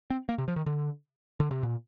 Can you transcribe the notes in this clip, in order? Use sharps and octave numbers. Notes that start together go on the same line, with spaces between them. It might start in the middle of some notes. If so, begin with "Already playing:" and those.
C4
A#3
C3
F3
D#3
D3
D3
C3
A#2